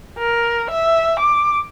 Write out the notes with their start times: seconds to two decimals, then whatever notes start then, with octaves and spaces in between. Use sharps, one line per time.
0.18 A#4
0.71 E5
1.19 D6